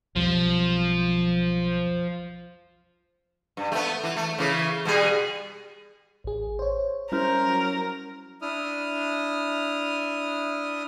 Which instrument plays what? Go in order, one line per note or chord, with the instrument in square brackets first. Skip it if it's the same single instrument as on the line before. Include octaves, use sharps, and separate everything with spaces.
[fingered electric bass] B1 F2 G3 [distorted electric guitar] F3
[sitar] G2
A3 B3
E3
A3
C#3 E3
B2 G3 G#4
[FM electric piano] A1 G#4
C5 C#5
[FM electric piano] G3 E4 F6 [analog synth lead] C#4 [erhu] A#4 [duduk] C5
[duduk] F#3
[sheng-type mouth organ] D4 E4 D#6 F6